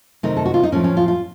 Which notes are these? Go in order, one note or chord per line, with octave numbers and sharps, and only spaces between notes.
C3 D#3 A3 D#4
A4
F#4
F4
D#4
A2 F3 A3 C#4
C#4
F4
F4